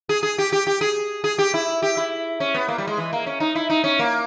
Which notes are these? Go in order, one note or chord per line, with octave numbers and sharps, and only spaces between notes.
G#4
G#4
G4
G4
G4
G#4
G#4
G4
E4
G4
E4
C#4
B3
A#3
G3
G#3
E3
A#3
C#4
D#4
E4
D#4
C#4
A#3